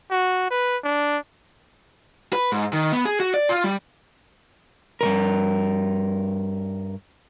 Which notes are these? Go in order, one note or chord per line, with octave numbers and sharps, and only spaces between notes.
F#4
B4
D4
B4
G#2
D#3
B3
G#4
F#4
D5
F4
G3
G2 C3 A#4